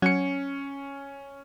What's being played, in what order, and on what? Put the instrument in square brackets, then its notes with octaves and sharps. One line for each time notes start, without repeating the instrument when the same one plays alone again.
[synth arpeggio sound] F#3 F#5 G#6 [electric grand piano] C#4 C#7